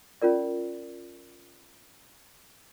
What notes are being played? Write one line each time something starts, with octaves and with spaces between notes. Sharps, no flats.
C#4 F4 A#4 D5